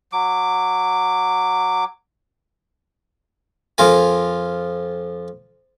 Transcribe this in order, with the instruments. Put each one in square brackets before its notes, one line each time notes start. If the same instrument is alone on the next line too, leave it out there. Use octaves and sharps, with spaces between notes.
[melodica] F#3 D6
[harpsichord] F2 F4 A#4 G#5